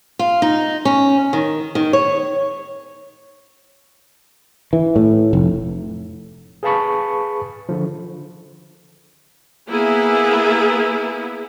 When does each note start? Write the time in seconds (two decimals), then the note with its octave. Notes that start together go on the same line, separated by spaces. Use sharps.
0.19 F4
0.42 D#4
0.85 C#4
1.33 D#3
1.75 D#3
1.93 C#5
4.73 E3
4.96 A2
5.33 F1
6.63 G#4 B4 F5 A5 B5 C#6
7.69 D3 F3
9.69 A#3 B3 E4 G#4